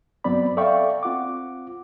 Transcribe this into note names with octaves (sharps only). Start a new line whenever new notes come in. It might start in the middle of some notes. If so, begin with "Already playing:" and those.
G2 F#3 B3 C4 D5 B5
A4 D5 E5 F5 G5 C#6
C4 F4 F#5 D6